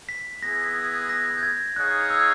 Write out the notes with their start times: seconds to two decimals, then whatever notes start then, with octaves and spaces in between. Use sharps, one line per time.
0.09 B6
0.42 B3 E4 G#4 A#6
1.09 A#6
1.37 G6
1.43 G#6
1.76 D#4 G#4 C#5 F5 F#6
2.10 E6